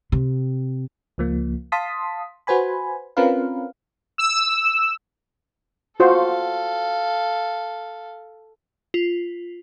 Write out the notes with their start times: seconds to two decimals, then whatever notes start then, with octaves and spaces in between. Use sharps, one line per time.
0.12 C3
1.18 C#2 F3 A#3
1.72 F5 A5 C6 D#6 B6
2.47 F#4 B4 C5 G#5 B5
3.17 C4 C#4 F4 A#4 B4 F5
4.18 E6
6.00 F4 F#4 A4 C5 F5
8.94 F4